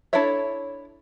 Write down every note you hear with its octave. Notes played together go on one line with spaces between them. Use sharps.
D4 E4 A4 C#5 E5